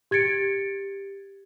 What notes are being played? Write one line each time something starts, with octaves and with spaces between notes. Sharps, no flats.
G4 G#6 A6 C#7 D7